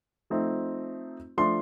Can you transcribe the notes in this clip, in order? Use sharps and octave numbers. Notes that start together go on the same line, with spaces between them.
F3 A3 C4 D#4
F3 A3 D4 C6